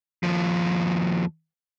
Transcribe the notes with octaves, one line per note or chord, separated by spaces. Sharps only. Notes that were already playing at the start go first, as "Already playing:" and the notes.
D#2 F3